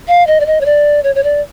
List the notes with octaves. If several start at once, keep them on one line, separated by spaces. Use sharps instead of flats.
F5
D#5
D5
D#5
C#5
D5
C#5
C#5
D5